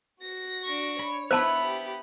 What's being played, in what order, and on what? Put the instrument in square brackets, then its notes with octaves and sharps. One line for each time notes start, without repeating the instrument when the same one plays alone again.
[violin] F#4 A#6
[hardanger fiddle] D4 C#6
[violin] C#5 [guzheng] B5
[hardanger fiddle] B3 B5 [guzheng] E4 B4 E5 [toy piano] C5 A5
[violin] G4